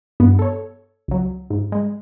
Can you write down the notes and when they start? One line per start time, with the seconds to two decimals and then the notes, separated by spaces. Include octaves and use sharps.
0.20 G2 B3
0.39 A4 C#5
1.08 C#2 F#3
1.50 G#2
1.72 G#3